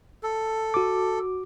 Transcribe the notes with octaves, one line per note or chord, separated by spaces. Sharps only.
A4
F#4 D6